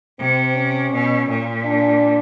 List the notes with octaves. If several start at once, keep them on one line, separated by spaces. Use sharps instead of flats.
C3 C4
C#4
B2
A#2
D4